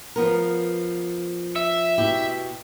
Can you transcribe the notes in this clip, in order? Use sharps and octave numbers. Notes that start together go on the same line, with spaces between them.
F3 B3 A#4
E5
B2 E4 G4